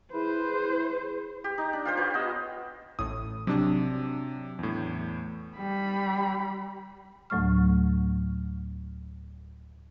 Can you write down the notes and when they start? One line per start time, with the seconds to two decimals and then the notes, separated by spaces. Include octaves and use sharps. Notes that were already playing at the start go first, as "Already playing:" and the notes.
0.13 E4 G#4 B4 C5
1.44 G4
1.58 D#4
1.73 D4
1.85 F4 G4 C5
1.97 F4 B4 C#5
2.14 B3 D#5 E6
2.99 A1 A2 D#6
3.47 C3 F#3 D4
4.59 E2 A2
5.57 G3 B5
7.30 D2 A2 F#3 A3 C#6 F6